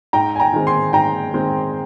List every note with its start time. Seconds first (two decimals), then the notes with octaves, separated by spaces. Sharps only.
0.13 G#2 G5 A#5
0.36 G#5
0.40 G5 A#5
0.53 D#3 G#3 C4
0.67 G#5 C6
0.93 G#2 G5 A#5
1.34 D#3 G#3 C4